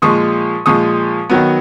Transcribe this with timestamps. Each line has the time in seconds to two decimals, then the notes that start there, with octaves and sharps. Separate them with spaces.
0.02 A#2 F3 G#3 C#6 D#6
0.66 A#2 F3 G#3 C#6 D#6
1.30 D#3 F#3 B3